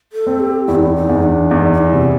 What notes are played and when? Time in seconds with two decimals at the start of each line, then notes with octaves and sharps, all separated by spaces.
0.13 A4
0.27 C4
0.40 G4
0.67 E2 E4
0.75 D#4
0.83 E4
0.96 D#4
1.09 E2
1.23 D4
1.51 E2 D#4
1.73 D#4
1.78 E4
1.92 C3